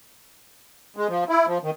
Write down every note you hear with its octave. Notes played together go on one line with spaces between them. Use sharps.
G#3
F3
E4
F3
D#3